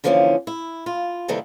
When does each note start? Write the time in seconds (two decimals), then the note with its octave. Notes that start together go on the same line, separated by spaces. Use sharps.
0.04 D3 E3 F3 A#3 C4 C#4
0.47 E4
0.86 F4
1.28 D#2 C3 D#3 E3 G3 A4